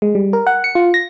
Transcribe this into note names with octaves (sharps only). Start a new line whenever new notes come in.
G#3
G3
A#4
F#5
C#7
F4
A#6